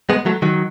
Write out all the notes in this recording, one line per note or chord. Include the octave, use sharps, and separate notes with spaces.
G#3 B3
F#3 A3
D#3 F#3